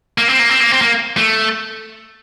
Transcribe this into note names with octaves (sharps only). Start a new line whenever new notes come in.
A#3
C4
A#3
C4
A#3
C4
A#3
A3